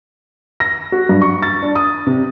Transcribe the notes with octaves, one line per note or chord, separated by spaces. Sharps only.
A#6
F#4
G2
C#6
A6
D4
D#6
C3